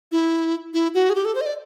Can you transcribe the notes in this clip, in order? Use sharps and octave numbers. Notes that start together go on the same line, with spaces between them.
E4
E4
F#4
G#4
G4
A4
C5
D#5
D5